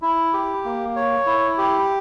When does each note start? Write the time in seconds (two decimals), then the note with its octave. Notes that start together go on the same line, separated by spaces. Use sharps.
0.02 E4
0.33 G4
0.65 A#3
0.96 C#5
1.26 E4
1.58 G4